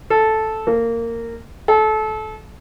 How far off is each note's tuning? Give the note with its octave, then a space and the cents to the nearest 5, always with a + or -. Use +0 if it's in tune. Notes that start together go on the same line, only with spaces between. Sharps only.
A4 -5
A#3 -15
A4 -25